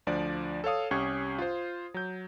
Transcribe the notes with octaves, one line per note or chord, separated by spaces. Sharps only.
D2 F3 D4 D5
A4 C#5 F5 D#6
C2 C#4 G4 C#6 G#6
F4 C5
F#3 G6